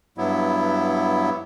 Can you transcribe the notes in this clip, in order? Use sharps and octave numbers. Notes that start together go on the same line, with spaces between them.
G2 F#3 B3 E4